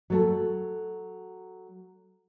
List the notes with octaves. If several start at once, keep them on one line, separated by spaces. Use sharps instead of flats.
F#3 A3 A4